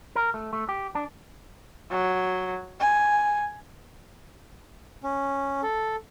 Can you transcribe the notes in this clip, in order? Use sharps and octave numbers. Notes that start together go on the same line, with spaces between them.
A#4
A3
A3
G4
D4
F#3
G#5
C#4
A4